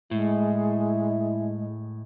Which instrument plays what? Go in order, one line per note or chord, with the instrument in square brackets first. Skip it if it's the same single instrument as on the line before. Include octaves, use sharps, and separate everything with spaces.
[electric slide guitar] A2 [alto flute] G#3 [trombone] E4